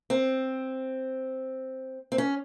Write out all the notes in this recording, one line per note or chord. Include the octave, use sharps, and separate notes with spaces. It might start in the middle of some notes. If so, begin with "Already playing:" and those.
C4
C4
C#4